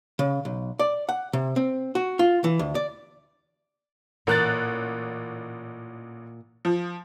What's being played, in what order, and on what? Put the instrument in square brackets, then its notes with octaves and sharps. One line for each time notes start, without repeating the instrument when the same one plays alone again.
[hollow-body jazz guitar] C#3
B1
D5
F#5
C3
C4
F#4
F4
E3
D2
D5
[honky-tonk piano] A1 F#6 A6 [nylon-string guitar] A#2 A#4
[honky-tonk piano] F3